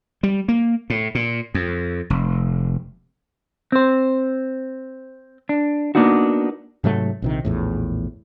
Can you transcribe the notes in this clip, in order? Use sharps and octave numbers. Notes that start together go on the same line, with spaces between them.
G3
A#3
A2
A#2
F2
F1
C4 C5
D4
A#3 B3 D4 D#4 F#4
G#2 C3 F#3 A3
A#1 C3 D#3
A#1 E2 A2